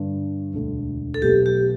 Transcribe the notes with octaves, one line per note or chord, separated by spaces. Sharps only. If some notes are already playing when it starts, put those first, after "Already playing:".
Already playing: G2 D3 G3 D4
E1 D2 D3 A3
A4
B1 B2 A3 G4
G4